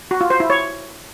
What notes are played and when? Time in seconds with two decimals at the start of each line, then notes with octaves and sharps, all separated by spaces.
0.11 F#4
0.21 F4
0.30 C5
0.40 E4
0.50 C#5